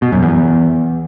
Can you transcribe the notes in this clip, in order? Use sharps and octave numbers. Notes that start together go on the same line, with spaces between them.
B2
F#2
E2